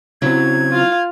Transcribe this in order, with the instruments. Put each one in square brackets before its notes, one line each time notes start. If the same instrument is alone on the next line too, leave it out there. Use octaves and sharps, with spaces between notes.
[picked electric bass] C#3 C4 [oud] F#3 E4 [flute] G#6
[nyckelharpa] F4 F5